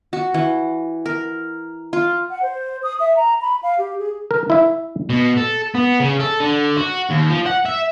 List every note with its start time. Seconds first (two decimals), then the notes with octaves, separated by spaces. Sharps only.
0.13 F#4
0.34 E3
1.06 A#4
1.93 F4
2.30 F#5
2.43 C5
2.83 D#6
3.00 E5
3.16 A#5
3.42 B5
3.63 F5
3.78 G4
3.99 G#4
4.31 A#4
4.50 E4 E5
5.10 B2
5.37 A4
5.75 B3
6.00 C#3
6.20 A4
6.40 D3
6.77 F#4
7.10 D#2
7.30 F3
7.46 F#5
7.66 E5